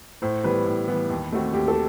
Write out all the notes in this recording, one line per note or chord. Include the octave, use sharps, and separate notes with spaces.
A2 C5
E3 G3 B3 B4
A2
E3 G3 B3
D#2
D#3 A3 C4 F#4
D#2 G4
A4